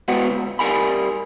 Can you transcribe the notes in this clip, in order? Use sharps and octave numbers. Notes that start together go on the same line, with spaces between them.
G#3 B3 F#4 B4 F#5 G5
C#2
G3 A#4 G#5 B5